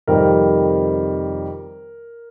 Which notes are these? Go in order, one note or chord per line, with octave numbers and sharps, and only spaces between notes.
F2 C3 D#3 G3 A#4